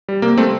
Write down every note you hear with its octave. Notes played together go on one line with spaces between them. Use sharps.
G3
C3 A#3
G3 A3 C4